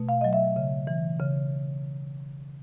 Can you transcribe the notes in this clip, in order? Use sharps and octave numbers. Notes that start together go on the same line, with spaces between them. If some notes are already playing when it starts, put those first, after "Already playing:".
Already playing: B2 A3
F5
F#3 D#5
E5
C#3
E3
C#3